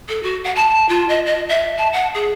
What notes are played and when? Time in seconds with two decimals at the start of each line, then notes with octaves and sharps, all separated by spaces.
0.08 A4
0.23 F#4
0.44 F#5
0.55 A5
0.89 F4
1.09 D#5
1.26 D#5
1.49 E5
1.77 A5
1.93 F#5
2.14 G#4